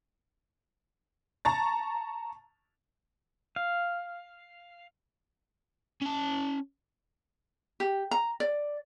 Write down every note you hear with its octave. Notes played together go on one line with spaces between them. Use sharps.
A5 A#5 C#6 A6
F5
C#4 A5
G4
A#5
D5